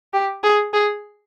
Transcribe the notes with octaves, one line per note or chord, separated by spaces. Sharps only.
G4
G#4
G#4